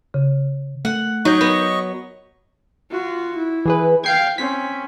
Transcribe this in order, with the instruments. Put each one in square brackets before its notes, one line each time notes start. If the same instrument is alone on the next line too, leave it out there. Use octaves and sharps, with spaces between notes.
[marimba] C#3
[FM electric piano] A3 [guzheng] F#5
[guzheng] F#3 [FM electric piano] D#4 G6 [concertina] D#5 C#6
[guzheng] B3
[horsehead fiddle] F4 F#4
E4
[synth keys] E3 G#4 B4
[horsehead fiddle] F5 G5 [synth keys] G#6 C7 D7
[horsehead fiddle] C4 C#4 [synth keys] B6